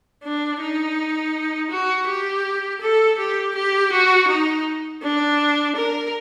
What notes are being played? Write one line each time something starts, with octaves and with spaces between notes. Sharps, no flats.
D4
D#4
F#4
G4
A4
G4
G4
F#4
D#4
D4
A#4